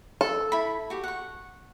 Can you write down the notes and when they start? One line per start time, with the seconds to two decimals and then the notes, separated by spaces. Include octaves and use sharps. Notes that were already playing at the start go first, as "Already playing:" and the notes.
0.21 A4
0.52 E4 B5
0.90 F#4 G4
1.04 F#5 C#6